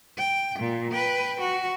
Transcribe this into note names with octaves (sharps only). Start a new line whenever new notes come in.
G5
A#2
B4 G5
F#4